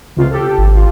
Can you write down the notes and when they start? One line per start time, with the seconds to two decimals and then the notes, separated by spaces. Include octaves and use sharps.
0.16 C#2 C3 F4
0.31 G4 A4
0.58 G#1
0.75 F4